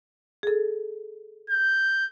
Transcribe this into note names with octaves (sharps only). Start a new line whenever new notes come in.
G#4 A4
G6